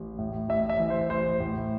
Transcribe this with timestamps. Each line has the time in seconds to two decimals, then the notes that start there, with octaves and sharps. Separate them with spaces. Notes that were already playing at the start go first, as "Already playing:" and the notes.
Already playing: A1
0.19 A2
0.49 A1 E5
0.69 E5
0.80 E3
0.90 C5
1.10 A1 C5
1.40 A2